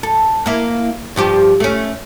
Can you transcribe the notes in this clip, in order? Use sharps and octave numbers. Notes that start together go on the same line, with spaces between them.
A4
A#3 E4
G2 F3 G4
A3 C#4